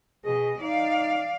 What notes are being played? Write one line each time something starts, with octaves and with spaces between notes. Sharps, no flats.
B2 G#4 D#5
D#4 D5 F5